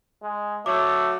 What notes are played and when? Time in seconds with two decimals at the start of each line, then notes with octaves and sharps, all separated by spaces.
0.22 G#3
0.66 F#3 A3 D6